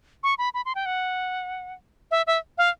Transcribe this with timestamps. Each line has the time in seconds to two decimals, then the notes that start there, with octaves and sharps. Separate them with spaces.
0.23 C#6
0.38 B5
0.54 B5
0.66 C6
0.75 G5
0.86 F#5
2.11 E5
2.27 E5
2.58 F5